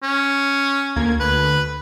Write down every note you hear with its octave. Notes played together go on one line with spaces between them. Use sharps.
C#4
D2 A#3 G#6
D2 B4